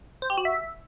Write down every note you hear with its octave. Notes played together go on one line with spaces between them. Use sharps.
C5
G4
F#4
E5